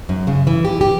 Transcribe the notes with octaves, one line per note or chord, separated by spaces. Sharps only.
F#2
C#3
E3
G4
G4